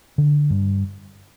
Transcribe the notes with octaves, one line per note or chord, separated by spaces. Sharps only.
D3
G2